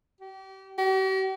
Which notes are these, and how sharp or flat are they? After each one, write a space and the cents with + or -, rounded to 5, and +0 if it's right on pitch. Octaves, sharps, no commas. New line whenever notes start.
G4 -35
G4 -45